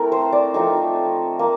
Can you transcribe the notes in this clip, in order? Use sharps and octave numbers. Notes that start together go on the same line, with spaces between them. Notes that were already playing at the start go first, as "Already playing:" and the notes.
Already playing: A3 C4 E4 A#4
C5
D5
F3 A3 C4 D#4 A4
A#3